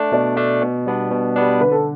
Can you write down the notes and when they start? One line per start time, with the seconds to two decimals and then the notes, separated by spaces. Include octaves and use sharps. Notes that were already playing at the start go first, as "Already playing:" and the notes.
Already playing: A3 D4
0.12 B2 D5
0.37 A3 D4
0.61 B2
0.86 G3 B3 D4
1.11 B2
1.36 G3 B3 D4
1.61 D3 B4
1.72 A4